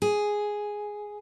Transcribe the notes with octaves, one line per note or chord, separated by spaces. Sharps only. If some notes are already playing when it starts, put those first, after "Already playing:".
G#4